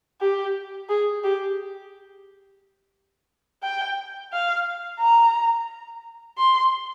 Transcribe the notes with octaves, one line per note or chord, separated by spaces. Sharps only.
G4
G#4
G4
G5
F5
A#5
C6